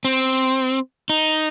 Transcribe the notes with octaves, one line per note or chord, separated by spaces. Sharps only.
C4
D#4